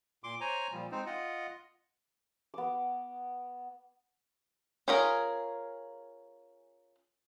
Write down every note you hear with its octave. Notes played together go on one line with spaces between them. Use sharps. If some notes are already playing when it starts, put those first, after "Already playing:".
A#2 C6 D6
C5 C#5 G#5 A#5
A#2 F3 G3
G#3 C4 D#4 C5
F4 D#5 F#5
B3 D6
C#4 F4 G#4 A#4